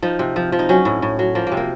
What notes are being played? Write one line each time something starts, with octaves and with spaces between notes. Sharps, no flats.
F3 D#4
C3
F3
F3
D#4
F#3 C#4
A2
A2
F#3
F3 A#3
C3 A#3
A#3